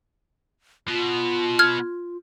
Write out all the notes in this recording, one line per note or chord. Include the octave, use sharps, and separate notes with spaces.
B2 F4
F6 G#6